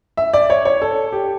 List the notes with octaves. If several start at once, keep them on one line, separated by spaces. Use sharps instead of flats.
E5
D5
C#5
C#5
A4
G4